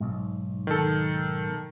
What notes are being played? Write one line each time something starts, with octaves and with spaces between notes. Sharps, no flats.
B1 G#2
D#3 A4